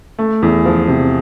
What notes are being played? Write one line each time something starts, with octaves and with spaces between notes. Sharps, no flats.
A3
E2
F3
C3